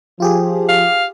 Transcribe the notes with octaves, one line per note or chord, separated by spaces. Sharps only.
F3 F4 G4 G#4
F5